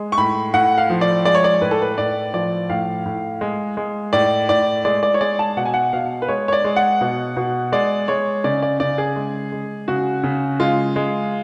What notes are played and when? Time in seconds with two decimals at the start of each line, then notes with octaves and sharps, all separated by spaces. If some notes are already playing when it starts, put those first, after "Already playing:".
Already playing: G#3
0.12 C#6
0.18 A2 B5
0.54 A2 F#5
0.78 F5
0.90 F3
1.01 D5
1.25 G#3 D5
1.35 C#5
1.44 D5
1.61 A2 B4
1.71 A4
1.82 B4
1.98 A2 D5
2.33 F3 D5
2.70 A2 F5
3.06 A2
3.41 G#3
3.77 G#3
4.13 A2 D5
4.49 A2 D5
4.85 G#3 D5
5.03 D5
5.14 C#5
5.21 G#3 D5
5.39 A5
5.57 B2 F#5
5.65 G#5
5.74 F#5
5.93 B2 F5
6.22 B4
6.28 G#3 C#5
6.48 C#5
6.53 D5
6.64 G#3
6.76 F#5
7.01 B2
7.37 B2
7.72 G#3 D5
8.08 G#3 C#5
8.44 C#3 D5
8.63 D5
8.80 C#3 D5
8.98 G#4
9.16 G#3
9.52 G#3
9.88 C#3 F#4
10.24 C#3
10.60 G#3 F4
10.96 G#3